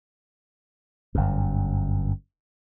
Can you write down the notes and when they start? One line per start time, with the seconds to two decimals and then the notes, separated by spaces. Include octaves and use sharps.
1.15 G1 F#2